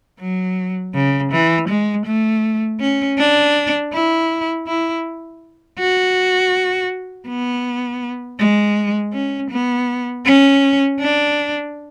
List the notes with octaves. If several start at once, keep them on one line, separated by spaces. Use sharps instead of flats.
F#3
C#3
E3
G#3
A3
C#4
D4
E4
E4
F#4
B3
G#3
C#4
B3
C#4
D4